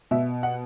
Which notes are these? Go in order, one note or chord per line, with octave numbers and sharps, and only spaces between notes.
B2 E5
F#5